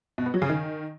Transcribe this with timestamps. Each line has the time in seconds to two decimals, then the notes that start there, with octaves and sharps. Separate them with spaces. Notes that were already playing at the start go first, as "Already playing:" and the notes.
0.18 B2
0.26 B3
0.34 F#3
0.42 C#3
0.50 D#3